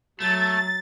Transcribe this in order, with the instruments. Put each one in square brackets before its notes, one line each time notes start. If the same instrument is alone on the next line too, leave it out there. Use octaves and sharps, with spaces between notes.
[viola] F#3 [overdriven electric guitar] A3 [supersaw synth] A6